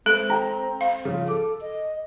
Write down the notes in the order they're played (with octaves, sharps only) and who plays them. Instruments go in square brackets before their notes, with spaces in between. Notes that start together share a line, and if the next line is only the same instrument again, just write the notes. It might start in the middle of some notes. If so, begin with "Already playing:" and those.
[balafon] G#3 A4 [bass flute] C4
[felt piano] G5 A#5
[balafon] F5
[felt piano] C#3 F3
[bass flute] A4 [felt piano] D6
[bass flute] D#5